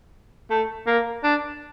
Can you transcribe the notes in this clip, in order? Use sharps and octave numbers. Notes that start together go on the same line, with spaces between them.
A3
A#3
D4